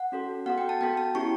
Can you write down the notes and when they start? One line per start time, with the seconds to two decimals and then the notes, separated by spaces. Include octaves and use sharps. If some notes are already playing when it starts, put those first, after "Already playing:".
Already playing: F#5
0.12 C#4 F#4 A4
0.46 B3 F#4 A4 F#5
0.58 G5
0.69 A5
0.81 B3 F#4 A4 G5
0.97 A5
1.15 C#4 E4 G4 C#6